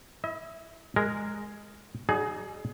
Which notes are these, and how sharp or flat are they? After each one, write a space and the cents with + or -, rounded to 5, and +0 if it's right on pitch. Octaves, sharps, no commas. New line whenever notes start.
E4 +0 D#5 +45
G#3 +0 A#4 -5
G3 -40 D#4 -15 G#4 +20